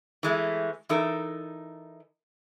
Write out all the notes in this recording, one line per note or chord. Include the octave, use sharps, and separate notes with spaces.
E3 G#3 A3
E3 D#4 A4 A#4